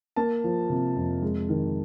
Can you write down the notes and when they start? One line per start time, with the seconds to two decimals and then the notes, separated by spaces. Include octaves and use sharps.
0.16 A#3 A5
0.44 F3
0.70 C3
0.96 F2
1.22 G#3
1.49 D#3